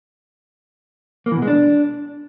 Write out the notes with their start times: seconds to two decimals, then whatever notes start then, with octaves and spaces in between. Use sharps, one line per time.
1.26 A#3
1.31 E3
1.37 B2
1.42 G#3
1.47 D4